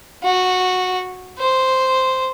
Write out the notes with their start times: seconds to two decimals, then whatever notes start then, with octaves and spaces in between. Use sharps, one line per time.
0.23 F#4
1.38 C5